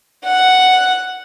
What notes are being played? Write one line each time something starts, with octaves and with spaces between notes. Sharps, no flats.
F#5